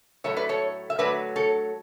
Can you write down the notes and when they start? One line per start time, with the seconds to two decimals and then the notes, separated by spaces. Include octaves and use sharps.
0.24 A2 F#3 A3 C#5 E5
0.37 B4 D5
0.49 A4 C#5
0.90 E5
0.98 D3 F#3 A3 B4 D5
1.36 A4 C#5